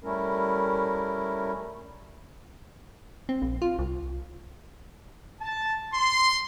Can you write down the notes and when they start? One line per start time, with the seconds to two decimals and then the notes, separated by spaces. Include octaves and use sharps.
0.04 G3 A3 C#4 E4 A#4
3.29 C4
3.42 A#1
3.62 F4
3.79 C2
5.41 A5
5.93 C6